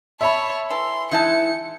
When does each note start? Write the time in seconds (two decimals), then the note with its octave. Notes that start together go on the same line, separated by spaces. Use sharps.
0.21 C#5 E5 A5 B5
0.70 E3 A4 C6
1.11 E3 G#3 D#4 E4 A5 C#7